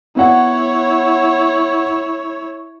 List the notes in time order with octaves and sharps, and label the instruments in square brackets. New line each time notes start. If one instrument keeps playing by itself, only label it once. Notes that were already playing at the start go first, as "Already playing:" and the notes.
[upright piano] B3 F#5 [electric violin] E4 C#5